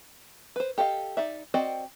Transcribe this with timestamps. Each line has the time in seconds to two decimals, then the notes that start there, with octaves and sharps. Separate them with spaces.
0.56 B4 C5
0.78 G4 A4 D#5 F5
1.17 D#4 D5 E5
1.54 C4 F#4 D5 D#5 G5